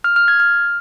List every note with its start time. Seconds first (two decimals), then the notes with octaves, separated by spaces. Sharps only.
0.04 F6
0.16 F6
0.28 G#6
0.40 F6